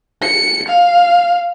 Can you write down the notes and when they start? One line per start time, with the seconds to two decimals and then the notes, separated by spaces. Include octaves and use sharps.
0.22 C#7
0.68 F5